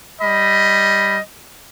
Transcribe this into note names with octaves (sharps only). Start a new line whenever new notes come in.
G3 D#5 B5